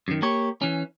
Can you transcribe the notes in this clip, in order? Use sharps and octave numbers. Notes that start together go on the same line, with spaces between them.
F#2 D#3
A#3 G4 C#5
E3 C#4